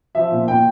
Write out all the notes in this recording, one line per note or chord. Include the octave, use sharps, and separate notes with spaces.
F3 E5
A#2
A#2 G5